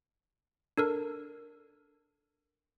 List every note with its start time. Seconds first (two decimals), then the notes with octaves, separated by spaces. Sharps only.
0.77 D4 A4 A#4